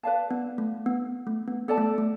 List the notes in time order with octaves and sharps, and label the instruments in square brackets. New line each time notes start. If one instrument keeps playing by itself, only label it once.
[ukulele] B4 D5 F5 A5
[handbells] B3
A3
B3
A3
B3
[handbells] B3 [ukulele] A4 D5 A5
[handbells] A3
A3